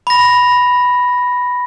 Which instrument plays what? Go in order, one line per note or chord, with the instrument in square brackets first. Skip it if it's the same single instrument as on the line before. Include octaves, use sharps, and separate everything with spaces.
[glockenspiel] B5 A#6